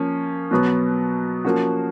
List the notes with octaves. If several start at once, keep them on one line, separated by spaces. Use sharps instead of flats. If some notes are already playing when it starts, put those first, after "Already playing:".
Already playing: F3 A#3 C#4
B2 F#3 B3
F3 A#3 C#4 F#4